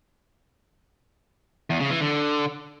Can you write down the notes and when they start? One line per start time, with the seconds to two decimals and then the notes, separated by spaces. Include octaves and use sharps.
1.70 E2
1.80 C#3
1.90 E3
2.01 D3